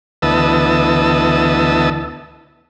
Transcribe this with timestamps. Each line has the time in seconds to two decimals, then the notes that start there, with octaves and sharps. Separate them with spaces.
0.22 D2 E3 B3 D#5 A5 E6